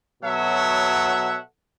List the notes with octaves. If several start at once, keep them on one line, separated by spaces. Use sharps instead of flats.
B2 F#3 A4 C#5 E5 F#5